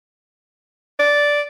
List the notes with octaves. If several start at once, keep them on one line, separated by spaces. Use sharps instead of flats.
D5